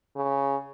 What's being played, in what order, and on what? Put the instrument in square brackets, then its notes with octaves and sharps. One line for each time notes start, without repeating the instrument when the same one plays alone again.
[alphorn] C#3